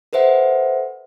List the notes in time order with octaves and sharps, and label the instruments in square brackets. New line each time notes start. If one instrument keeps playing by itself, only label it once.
[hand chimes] A4 B4 C5 E5 F#5